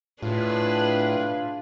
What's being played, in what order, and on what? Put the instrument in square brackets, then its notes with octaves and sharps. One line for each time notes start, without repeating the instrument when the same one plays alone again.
[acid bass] A2 [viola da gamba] D4 G#4 B4 [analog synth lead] F4